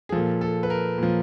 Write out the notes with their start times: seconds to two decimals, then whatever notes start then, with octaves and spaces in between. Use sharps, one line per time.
0.09 G#4
0.12 A#2 F3 A4
0.41 A4
0.63 B4
0.70 A#4
0.98 A#2 F3